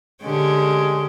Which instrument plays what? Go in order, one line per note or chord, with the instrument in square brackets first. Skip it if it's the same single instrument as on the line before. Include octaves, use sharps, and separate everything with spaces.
[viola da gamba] D3 C#4 G4 [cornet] G#3